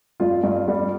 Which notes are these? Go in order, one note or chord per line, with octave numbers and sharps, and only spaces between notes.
G2 F4
G2
G3